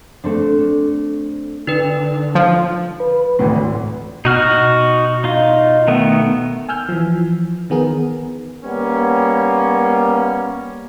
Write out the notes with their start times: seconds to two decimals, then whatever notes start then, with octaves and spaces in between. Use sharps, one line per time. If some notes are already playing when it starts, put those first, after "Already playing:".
0.24 A3 C4 D4
1.67 D3 D#4 B4
2.35 F3
3.00 B4
3.39 G#1 D2 A2
4.25 B2 D#4 F#4 F6
5.24 D#4 F4
5.88 D#3 A3 B3
6.69 G#5 E6 F6 G6
6.89 E3 F3
7.70 D#3 B3 G#4 A#4
8.64 G3 A#3 B3 C#4